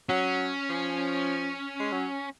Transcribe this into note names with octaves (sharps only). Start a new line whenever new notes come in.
F#3 C#4
F3
G#3
F#3